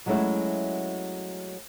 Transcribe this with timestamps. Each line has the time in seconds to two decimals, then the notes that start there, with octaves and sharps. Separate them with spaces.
0.06 F#3 G#3 A3 C#4 E4 F#4